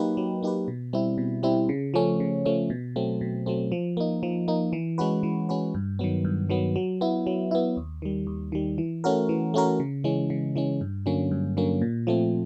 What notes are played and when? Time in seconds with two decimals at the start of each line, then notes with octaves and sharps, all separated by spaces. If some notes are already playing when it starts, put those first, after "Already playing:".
Already playing: F#3 A#3 D#4 G4 B4
0.17 F#3
0.43 A#3 D#4 G4 B4
0.68 B2
0.93 G3 C4 E4
1.18 B2
1.43 G3 C4 E4
1.69 C#3
1.94 F3 A3 C#4
2.20 C#3
2.45 F3 A3 C#4
2.70 B2
2.96 F#3 A3 C4
3.21 B2
3.46 F#3 A3 C4
3.72 F3
3.97 A#3 D#4
4.23 F3
4.48 A#3 D#4
4.73 E3
4.98 G#3 C#4 F#4 B4
5.23 E3
5.49 G#3 C#4 F#4 B4
5.74 G2
5.99 D#3 F#3 B3
6.25 G2
6.50 D#3 F#3 B3
6.76 F#3
7.01 B3 E4
7.27 F#3
7.51 B3 E4
7.77 D#2
8.02 D#3 G3
8.27 D#2
8.52 D#3 G3
8.78 E3
9.04 A3 C#4 F#4 A#4
9.29 E3
9.54 A3 C#4 F#4 A#4
9.80 C#3
10.04 E3 G#3 C#4
10.30 C#3
10.56 E3 G#3 C#4
10.81 G2
11.06 D3 F#3 A#3 C#4
11.31 G2
11.57 D3 F#3 A#3 C#4
11.81 A#2
12.07 F3 A3 C4